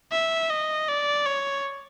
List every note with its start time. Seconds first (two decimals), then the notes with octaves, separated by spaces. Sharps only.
0.12 E5
0.50 D#5
0.88 D5
1.26 C#5